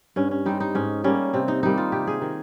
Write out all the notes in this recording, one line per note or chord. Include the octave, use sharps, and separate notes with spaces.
G2 C#4
C#4
G3 C4 D#4
D#4
G#2 C#4
G3 A#3 C#4
C3 C4
D#4
D#3 G3 A#3 D#4
F4
C3 G4
G#4
D#3 A#3